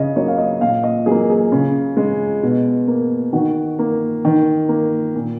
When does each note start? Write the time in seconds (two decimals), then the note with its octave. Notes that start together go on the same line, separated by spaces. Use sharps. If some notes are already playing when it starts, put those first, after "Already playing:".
Already playing: C#3 D#5
0.16 F#3 A#3 C#5
0.28 F5
0.38 D#5
0.61 A#2 F5
0.83 D#5
1.06 F#3 A#3 G#4
1.30 G#4
1.52 C#3
1.97 G#3
2.43 B2
2.88 A#3
3.33 D#3 F#4
3.79 A#3
4.25 D#3
4.69 A#3
5.15 A#2